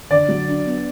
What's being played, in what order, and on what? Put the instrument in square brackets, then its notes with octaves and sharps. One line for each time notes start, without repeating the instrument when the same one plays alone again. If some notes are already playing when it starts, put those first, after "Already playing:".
[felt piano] D3 [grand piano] D5
[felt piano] F#3
D4
B3